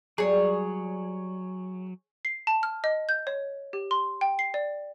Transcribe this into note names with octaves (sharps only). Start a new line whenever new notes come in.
F#3 G3 G#4 C#5 D5
C7
A5
F6
D#5
G6
C#5
G4
C6
G5
C7
D5